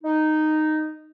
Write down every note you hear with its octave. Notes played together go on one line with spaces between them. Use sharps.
D#4